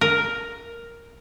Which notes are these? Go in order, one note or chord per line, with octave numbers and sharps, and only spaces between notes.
A#4